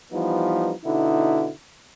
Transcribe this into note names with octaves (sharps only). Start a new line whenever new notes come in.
E3 F3 G3 B3 D#4
B2 D3 D#4 E4